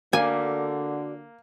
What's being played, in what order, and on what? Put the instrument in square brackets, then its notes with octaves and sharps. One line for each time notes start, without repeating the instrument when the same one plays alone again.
[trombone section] D3 [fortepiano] A#3 [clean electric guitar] F#4 D5 [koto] G#5